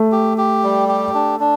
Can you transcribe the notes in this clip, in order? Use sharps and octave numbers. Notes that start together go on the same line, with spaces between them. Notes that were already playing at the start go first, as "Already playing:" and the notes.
Already playing: A3
G4
G4
G3
G4
D4
D4